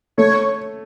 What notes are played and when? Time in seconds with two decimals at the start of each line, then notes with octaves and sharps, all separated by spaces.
0.18 A3 C#5